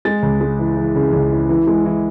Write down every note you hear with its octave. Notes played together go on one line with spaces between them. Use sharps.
G#3 A6
C#2
G#3
E3
E3
C#3
C#2
E3
E3
G#3
E3